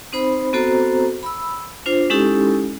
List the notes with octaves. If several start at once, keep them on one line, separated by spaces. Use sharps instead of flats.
C4 D#4 C5 B5
B3 C4 F#4 A4 C5 A#5
B5 E6
D4 F4 C5
G#3 C#4 D#4 E4 G4 A4